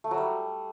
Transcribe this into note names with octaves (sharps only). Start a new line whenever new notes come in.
A3
F#3
G3